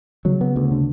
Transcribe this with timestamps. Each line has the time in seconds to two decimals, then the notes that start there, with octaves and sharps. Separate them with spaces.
0.25 C#3 F#3
0.41 B3
0.56 D2
0.71 D3